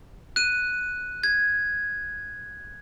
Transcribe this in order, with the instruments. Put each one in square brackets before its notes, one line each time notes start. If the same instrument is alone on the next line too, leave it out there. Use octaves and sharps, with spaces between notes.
[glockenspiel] F#6 D#7
G#6